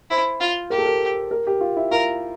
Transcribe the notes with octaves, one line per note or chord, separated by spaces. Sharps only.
E4 C5
F4
G4 A#4
A4
A#4
A#4
G4
F4
E4
F4 A#4